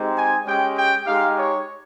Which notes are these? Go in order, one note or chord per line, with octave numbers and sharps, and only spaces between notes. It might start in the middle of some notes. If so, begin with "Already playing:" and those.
Already playing: G#3 C4 D#4 G4
G#5
G#3 C#4 G4 G5
G5
G#3 D#4 G4 F5
C#5